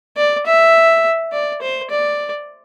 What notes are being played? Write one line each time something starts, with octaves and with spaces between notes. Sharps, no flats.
D5
E5
D5
C5
D5